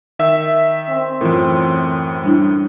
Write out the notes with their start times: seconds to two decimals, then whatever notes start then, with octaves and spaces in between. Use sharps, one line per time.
0.19 D#3 E5 E6
0.90 C4
1.21 F#2 A2 E3 F4 A#4
2.24 G3 D4 E4